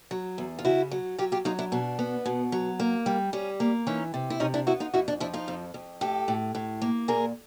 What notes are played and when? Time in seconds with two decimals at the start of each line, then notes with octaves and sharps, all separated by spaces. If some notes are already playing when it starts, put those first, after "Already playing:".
0.11 F#3
0.38 E2
0.59 F4
0.65 C#3 E4 F#4
0.91 F#3
1.18 F#3 F4 G4
1.32 F4 G4
1.45 F#3 D#4 F4
1.59 D4 E4
1.72 B2 D4
1.99 B3
2.25 B2
2.52 F#3
2.80 A#3
3.06 G3
3.33 G3 C#4
3.60 A#3
3.87 E3 C#4 D#4
4.14 C3
4.30 E4
4.40 C3 C#4 D#4
4.54 D4 E4
4.67 B3 E4 F#4
4.80 D#4 F4
4.93 F2 E4 F#4
5.08 D4
5.20 F3 D4 E4
5.33 D#4 F4
5.48 F2
5.74 F2
6.01 A2 G4 A4
6.28 A2
6.55 A2
6.82 A#3
7.08 A#2 G#4 A#4